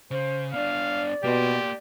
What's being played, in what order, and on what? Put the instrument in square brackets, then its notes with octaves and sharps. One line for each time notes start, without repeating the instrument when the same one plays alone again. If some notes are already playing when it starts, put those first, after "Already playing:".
[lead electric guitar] C#3 [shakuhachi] C5
[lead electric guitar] B3 D4 [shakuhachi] D5 [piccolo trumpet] F5
[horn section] B2 [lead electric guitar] A#3 C6 [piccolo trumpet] G4